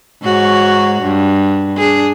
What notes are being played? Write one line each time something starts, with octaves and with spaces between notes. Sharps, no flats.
G#2 F#4 C#5
G2
D4 G#4